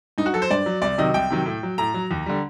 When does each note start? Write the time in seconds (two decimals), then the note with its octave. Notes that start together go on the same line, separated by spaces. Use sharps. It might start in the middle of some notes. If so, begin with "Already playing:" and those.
0.18 G2 D#4
0.26 F#4
0.34 F#3 A4
0.42 C5
0.51 G2 D5
0.66 F#3
0.82 C2 D5
0.98 C3 D#3 F#3 D#5
1.14 C2 G5
1.30 C3 D#3 F#3
1.46 A2
1.63 F#3
1.78 A2 A#5
1.94 F#3
2.11 D#2
2.26 D3 G3